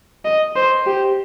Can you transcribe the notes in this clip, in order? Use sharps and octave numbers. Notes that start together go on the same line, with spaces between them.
D#5
C5
G4